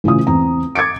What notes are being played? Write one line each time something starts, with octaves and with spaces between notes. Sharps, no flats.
A1 C#3 E3 F4 D#6
E2 C4 A#5
D6 G#6 A6 C#7 D7